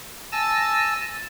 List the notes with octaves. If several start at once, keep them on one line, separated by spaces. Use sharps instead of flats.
G#5 A5 E6 A6 A#6